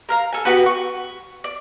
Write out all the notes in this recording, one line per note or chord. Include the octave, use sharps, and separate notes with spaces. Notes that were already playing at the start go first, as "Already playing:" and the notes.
A#4 F5 A#5
A4 G#5
B3 F#4 G4 B4
C#6
D5